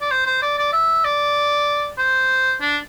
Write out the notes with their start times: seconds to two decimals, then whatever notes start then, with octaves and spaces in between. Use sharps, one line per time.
0.01 D5
0.11 C5
0.26 C5
0.42 D5
0.58 D5
0.73 E5
1.04 D5
1.98 C5
2.61 D4